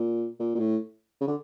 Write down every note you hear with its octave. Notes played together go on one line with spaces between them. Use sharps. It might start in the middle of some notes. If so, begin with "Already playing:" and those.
Already playing: A#2
A#2
A#2
A2
C#3
D3